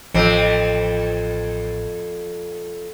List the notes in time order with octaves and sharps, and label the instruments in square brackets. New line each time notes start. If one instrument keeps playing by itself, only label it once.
[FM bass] A1 [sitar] F2 C4